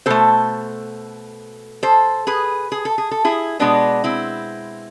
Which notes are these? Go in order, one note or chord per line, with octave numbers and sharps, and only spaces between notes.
B2 A3 A4 C5
A4 C5
G#4 B4
G#4
A4
G#4
A4
E4 G#4
B2 G#3 B3 D4
C4 E4